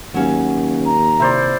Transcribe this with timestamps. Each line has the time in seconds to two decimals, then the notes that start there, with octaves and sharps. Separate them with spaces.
0.14 D#2 F#3 C#4 F5
0.85 A#5
1.20 C3 E4 C5 D5